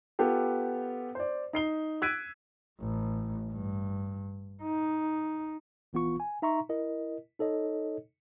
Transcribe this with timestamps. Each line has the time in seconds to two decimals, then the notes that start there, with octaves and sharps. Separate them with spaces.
0.19 B3 F4 G4 A4
1.15 C5 D5
1.53 D#4 C7 G7
2.02 E6 F#6 G#6 B6 D7 D#7
2.80 A1
3.51 G2
4.63 D#4
5.93 A#1 E3 B3 F4 C#6
6.20 G#5
6.42 D#4 E5 A#5 C6 C#6
6.69 E4 A#4 D#5
7.39 D#4 A4 C#5 D#5